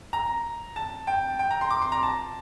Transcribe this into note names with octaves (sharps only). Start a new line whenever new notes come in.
A#5
A5
G5
G5
A#5
C6
D6
C6
A#5
A5